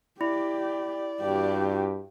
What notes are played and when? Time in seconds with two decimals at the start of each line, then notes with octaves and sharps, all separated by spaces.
0.21 E4 G4 D5
1.21 G2 F#4 G4